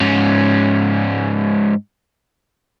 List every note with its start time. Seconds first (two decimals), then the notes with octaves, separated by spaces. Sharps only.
0.01 G#2 C#4